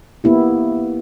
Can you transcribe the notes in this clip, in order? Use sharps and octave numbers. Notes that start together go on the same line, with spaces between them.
A#3 B3 E4 G4